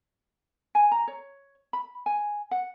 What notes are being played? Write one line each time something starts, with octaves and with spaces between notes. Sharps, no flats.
G#5
A#5
C#5
B5
G#5
F#5